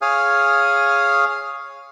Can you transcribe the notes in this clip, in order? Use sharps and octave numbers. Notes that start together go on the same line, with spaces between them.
G#4 C#5 F5 G#5 D#6 F6